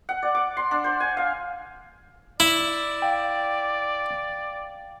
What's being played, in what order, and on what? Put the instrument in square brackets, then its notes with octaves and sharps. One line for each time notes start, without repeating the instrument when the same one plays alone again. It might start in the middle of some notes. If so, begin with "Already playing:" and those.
[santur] F#5
D5
D6
C6
D4
C5
G#5
F5
[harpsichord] E4 [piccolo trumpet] D5
[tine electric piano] F5 G5